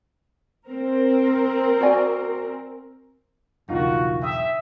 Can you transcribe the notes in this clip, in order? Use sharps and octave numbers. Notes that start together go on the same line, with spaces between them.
C4 A#4
F#4 D5 G#5
B1 E2 G2 C#3 D#4 F4 F#4 A#4
E5 G5 D#6